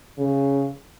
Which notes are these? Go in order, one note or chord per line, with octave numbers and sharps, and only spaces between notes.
C#3